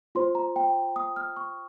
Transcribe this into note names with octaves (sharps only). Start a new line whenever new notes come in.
F4 C5 C6
A#5
G5
D#6
F6
C#6